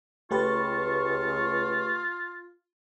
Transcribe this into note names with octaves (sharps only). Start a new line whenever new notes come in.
C#2 A3 F4 G4 B4 A5 C#6